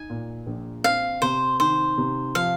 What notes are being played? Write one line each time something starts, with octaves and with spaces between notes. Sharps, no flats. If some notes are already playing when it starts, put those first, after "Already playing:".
Already playing: D#4 G#5
A#2
A#1
C4 F5
C3 C5
D#3 C5
C3
F3 F5